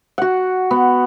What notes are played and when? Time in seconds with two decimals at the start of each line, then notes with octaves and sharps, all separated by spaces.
0.18 F#4 F#5
0.71 B3